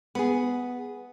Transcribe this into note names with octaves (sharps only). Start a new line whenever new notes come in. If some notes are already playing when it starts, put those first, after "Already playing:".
B3 G#4